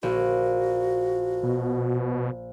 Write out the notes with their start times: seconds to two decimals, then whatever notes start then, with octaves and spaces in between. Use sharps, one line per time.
0.03 A#1 F#4
1.43 B2